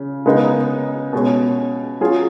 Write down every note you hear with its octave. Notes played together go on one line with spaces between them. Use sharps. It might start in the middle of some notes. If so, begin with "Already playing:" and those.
Already playing: C#3
C#3 G#3 B3 D#4
B2 G#3 C#4
F#3 C#4 F4 G#4